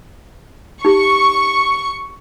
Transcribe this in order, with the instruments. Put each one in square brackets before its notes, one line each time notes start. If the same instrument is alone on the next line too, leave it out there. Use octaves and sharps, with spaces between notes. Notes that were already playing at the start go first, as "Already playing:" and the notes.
[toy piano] D#4 G4 [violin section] C#6